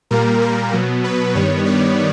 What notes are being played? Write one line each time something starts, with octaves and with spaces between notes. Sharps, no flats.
A#2 G3 A#3 A#4
A#4
B2 F#3 B3
B4
G2 D#3 G3 B3 C#5
D5